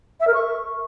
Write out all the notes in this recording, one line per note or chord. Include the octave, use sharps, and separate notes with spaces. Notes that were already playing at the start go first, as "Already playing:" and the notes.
E5
A#4
C#6